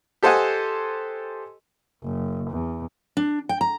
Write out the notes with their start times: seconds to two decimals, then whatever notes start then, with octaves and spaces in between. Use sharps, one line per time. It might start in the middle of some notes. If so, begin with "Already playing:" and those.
0.23 G4 A4 C5 D#5 F#5 G#5
2.03 F#1
2.51 E2
3.17 D4
3.49 G5
3.61 A#5